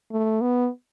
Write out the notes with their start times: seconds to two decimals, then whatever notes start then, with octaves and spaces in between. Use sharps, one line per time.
0.12 A3
0.41 B3